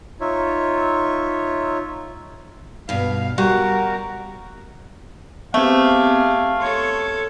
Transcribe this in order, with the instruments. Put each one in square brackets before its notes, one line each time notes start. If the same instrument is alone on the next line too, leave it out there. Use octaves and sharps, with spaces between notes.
[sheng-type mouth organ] D#4 F4 C#5 E5
[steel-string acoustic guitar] G2 B2 [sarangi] F5
[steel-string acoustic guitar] G3 [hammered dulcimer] F#4 [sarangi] A#4
[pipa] A3 [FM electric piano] B3 C4 [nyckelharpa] G4 G#4 [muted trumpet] F5
[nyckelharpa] A4 C#5 [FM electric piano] C6